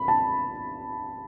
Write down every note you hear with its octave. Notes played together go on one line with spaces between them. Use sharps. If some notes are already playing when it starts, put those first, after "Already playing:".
Already playing: B5
A5